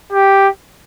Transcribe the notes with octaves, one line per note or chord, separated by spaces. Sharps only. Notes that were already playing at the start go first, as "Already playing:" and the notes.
G4